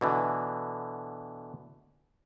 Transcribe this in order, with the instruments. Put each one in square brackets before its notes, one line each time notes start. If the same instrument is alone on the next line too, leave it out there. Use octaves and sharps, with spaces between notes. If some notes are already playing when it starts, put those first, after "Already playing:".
[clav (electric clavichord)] B2 D3 E3